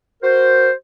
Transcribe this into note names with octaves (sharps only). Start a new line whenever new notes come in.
F#4 A#4 C5